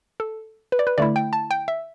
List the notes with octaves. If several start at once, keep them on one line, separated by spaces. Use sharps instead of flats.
A4
B4
D5
B4
D3 A3 E4 D5
G5
A5
G5
E5